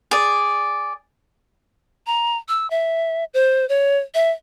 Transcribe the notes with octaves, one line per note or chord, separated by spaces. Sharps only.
G#4 D5
A#5
E6
E5
C5
C#5
E5